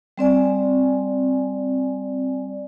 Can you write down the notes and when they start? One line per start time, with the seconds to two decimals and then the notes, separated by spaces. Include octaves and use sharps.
0.18 G3 C4 D5 G#5